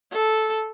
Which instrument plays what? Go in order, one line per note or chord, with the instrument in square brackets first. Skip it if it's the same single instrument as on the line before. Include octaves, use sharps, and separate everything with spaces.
[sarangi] A4